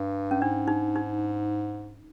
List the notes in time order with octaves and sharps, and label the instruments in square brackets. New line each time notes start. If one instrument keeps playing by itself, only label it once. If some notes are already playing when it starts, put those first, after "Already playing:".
Already playing: [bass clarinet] G2
[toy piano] C#4
[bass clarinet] G#2 [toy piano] D4
[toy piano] D#4
D#4